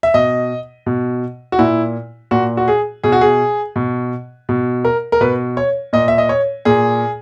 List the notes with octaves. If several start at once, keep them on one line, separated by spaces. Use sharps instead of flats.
E5
B2 D#5
B2
F#4
A#2 E4
A#2 F#4
F#4
G#4
B2 G#4
F#4
G#4
B2
B2
A#4
A#4
B2 B4
C#5
A#2 D#5
E5
D#5
C#5
A#2 G#4